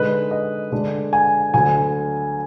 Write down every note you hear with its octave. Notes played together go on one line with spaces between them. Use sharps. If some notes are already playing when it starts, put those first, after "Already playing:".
Already playing: D3 G#3 D#4 B4
D#5
D3 G#3 D4
G#5
D2 D3 F#3 G#5